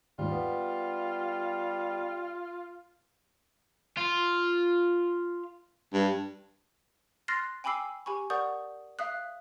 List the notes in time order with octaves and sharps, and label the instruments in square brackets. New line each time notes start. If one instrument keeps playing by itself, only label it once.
[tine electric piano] D#2 G#2 [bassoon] G3 [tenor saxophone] F4
[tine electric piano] B3
[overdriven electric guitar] F4
[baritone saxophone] G2
[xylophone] C6 F6 F#6 A6 A#6 C7
G5 G#5 B5 D6 E6 C7
G4 G#5 B5 C#6
A#4 D5 F#5 C#6 D#6 G6
E5 F5 D#6 F#6